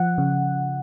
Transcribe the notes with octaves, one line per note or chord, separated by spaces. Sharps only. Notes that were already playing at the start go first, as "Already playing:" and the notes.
Already playing: F3 F#5
C#3